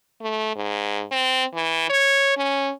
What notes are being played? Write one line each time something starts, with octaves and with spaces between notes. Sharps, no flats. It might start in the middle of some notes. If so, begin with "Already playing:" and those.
A3
G#2
C4
E3
C#5
C#4